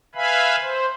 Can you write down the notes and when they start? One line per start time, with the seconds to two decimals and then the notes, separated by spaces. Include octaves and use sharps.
0.15 B4 E5 F5 G#5 B5
0.62 C5